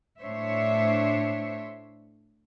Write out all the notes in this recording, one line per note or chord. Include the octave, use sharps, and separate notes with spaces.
A2 D4 C5 C#5 E5